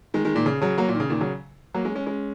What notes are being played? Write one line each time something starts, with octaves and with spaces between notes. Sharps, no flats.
D#3 G#3
D#3 G#3
A#2 D#3
C#3
C#3 F#3
F#3 A#3
A#2
D#3
C#3
A#2 D#3
C#3 F#3
F#3 A#3
G#3 C#4
G#3 C#4
G#3 C#4